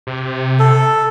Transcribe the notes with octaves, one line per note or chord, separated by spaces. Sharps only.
C3
A4